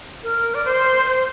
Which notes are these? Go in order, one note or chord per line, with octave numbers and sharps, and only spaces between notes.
A#4
D5
C5
C5